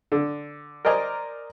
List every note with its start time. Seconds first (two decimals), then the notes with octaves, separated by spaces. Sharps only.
0.12 D3
0.85 A#4 C5 D5 D#5 G#5 A#5